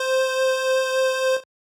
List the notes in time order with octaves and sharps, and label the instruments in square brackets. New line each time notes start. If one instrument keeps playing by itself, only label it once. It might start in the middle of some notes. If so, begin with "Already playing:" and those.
Already playing: [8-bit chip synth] C5